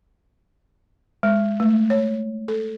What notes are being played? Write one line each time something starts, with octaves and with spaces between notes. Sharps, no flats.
G#3
A3
C#5
A4